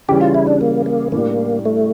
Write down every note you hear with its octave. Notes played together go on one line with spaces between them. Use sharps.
C#3 E3 G3 C#4 G4
F4
E4
D4
A#3
A#3
A2 G3 A#3 D4
A3